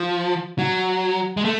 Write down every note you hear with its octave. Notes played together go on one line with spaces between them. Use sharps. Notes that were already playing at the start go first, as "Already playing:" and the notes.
Already playing: F3
F#3
G#3
A3